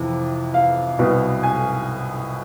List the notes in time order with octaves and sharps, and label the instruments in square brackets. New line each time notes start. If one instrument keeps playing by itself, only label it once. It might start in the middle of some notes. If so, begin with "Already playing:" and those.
Already playing: [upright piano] F2 C3 E3
F5
C2 B2
G#5